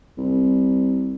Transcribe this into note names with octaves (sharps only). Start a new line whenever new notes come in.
C2